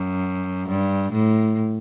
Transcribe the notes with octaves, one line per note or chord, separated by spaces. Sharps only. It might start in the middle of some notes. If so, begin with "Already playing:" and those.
Already playing: F#2
G2
A2